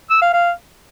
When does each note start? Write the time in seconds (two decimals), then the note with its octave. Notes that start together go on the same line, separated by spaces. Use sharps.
0.10 E6
0.22 F5
0.33 F5